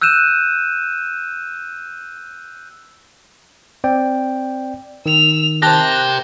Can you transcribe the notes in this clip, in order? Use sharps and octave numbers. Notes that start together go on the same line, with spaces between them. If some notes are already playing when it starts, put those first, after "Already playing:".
E6 F#6 G6 D#7 E7
C4 D5 G5
D#3 E6 F7
A#3 G4 C5 A5 F#6 A#6